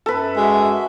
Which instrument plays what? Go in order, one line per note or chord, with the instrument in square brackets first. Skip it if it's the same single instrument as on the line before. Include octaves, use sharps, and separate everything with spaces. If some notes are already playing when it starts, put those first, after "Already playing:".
[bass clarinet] F#2 [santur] A4 B4
[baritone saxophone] G#3 [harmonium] F#4 E5